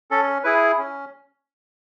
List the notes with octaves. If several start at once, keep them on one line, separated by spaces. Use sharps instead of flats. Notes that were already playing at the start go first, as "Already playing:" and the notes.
C#4 A4
E4 G#4 B4
C#4